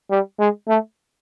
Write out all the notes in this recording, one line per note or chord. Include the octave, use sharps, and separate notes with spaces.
G3
G#3
A3